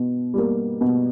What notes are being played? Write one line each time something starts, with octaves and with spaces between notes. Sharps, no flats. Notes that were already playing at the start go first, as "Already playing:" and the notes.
Already playing: B2
G3 A#3
B2